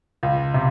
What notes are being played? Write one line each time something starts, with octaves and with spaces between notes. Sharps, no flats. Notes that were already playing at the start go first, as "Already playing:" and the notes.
C#2
C3